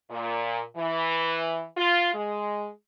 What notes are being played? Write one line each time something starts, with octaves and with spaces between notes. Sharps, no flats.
A#2
E3
F4
G#3